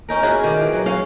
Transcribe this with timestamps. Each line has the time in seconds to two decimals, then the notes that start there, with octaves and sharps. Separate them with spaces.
0.09 C#4 D#4 A#4
0.23 C#4 E4 F#4 G#4
0.44 D#3 D5
0.61 E3
0.73 F#3
0.86 C#4 F5